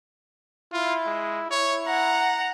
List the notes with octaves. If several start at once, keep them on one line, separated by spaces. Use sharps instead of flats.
E4 F4
G#3
E4 C#5
F#5 A#5